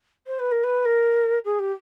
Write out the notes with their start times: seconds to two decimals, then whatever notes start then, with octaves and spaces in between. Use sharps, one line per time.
0.26 C5
0.39 B4
0.51 A#4
0.63 B4
0.85 A#4
1.44 G#4
1.59 G4